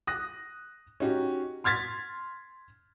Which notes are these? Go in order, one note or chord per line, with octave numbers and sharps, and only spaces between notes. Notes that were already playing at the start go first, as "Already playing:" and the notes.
D#6 F#6 A#6
C#4 D#4 F#4 G4
C6 F6 G#6 A6 B6